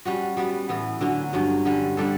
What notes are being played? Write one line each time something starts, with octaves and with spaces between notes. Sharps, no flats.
G3 C#4 F#4
G3 B3 F#4
A2 E3 B3
D3 F#3 C#4
G2 F#3 C#4
D3 G3 C#4
D3 G3 D4 A4